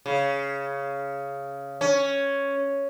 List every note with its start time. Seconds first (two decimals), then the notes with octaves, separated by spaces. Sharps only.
0.06 C#3
1.81 C#4